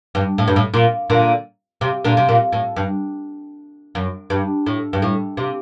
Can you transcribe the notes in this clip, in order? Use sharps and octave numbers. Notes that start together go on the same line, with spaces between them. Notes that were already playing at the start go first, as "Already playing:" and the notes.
G2
A2
G2
A2
A#2
A#2 D3
C3
A#2 D3
C3
A#2
A2
G2
F#2
G2
A2
G2
A2
C3